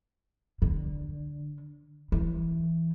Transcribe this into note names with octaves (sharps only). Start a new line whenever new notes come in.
D3
E3